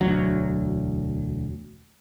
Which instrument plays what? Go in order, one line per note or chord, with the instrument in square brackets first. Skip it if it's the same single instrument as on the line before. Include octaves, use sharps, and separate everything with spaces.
[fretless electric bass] E1 D2 F#3